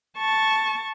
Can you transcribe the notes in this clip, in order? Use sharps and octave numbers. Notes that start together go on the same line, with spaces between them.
A5 C#6